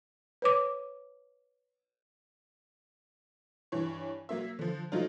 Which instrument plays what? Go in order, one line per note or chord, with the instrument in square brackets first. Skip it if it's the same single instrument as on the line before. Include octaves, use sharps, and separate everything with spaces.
[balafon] B4 C#5 D6
[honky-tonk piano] G2 E3 C#5
F#3 A#3 E5
D3 F3
F3 F#3 A3 D#4 F4